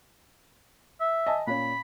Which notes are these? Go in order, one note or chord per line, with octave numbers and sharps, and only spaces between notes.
E5
D#5 G#5 A5
A#2 C#4 B5